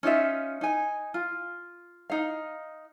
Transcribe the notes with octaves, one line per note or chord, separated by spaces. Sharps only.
C#4 D#4 F4 E5
D#4 G#5
F4
D#4 F5